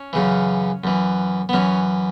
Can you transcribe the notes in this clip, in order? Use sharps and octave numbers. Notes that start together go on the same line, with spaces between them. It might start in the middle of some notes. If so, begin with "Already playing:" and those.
Already playing: C#4
F#2 C#3 E3
F#2 E3
B3
F#2 E3 C#4